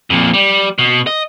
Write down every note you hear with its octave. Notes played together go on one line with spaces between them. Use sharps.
F2 A#2
G3
B2
D#5